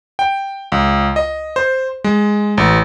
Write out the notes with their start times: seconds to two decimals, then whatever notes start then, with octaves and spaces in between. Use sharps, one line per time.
0.19 G5
0.72 C#2
1.16 D#5
1.56 C5
2.04 G#3
2.57 A1